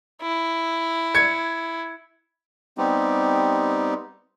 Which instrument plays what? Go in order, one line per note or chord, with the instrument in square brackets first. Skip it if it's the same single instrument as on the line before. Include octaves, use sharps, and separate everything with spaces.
[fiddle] E4
[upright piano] G#6 C#7
[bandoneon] G3 B3 C4 D#4 G4